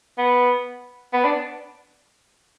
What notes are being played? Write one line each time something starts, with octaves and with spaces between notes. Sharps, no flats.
B3
B3
D4